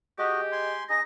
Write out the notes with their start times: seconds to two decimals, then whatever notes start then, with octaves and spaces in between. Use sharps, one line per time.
0.19 G#3 F#4 G4 D#5
0.52 G#5 C6
0.90 D#4 G#4 D#5 A#6